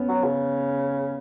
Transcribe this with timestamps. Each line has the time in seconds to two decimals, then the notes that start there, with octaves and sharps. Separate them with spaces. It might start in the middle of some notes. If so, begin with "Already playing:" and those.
Already playing: B3 C#4
0.08 F#3
0.24 C#3